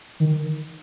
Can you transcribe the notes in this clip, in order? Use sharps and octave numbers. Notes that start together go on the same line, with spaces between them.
D#3